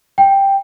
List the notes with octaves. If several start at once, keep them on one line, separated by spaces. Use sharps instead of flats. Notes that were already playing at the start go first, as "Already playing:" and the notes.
G5